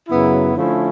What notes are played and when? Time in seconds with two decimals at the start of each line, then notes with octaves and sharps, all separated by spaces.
0.09 F#2 C#3 F#3 B3 E4
0.55 D3 F3 A3 C#4 E4